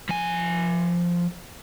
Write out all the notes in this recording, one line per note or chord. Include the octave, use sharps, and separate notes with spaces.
F3 G#5